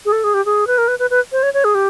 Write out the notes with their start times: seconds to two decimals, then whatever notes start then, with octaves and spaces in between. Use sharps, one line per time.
0.05 G#4
0.12 A4
0.24 G#4
0.34 G4
0.46 G#4
0.67 B4
0.78 A#4
0.88 B4
0.99 B4
1.10 B4
1.32 C5
1.43 C#5
1.54 C#5
1.64 G#4
1.75 G4